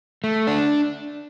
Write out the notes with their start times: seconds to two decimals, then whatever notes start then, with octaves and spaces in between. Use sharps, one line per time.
0.24 A3
0.47 D4